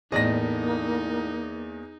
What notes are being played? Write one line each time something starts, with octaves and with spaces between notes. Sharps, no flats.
E2 A2 A#3 D#4 D5 D#5 A#6